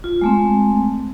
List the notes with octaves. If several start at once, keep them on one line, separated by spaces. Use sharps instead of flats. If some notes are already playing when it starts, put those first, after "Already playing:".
F4
G#3 A3 C4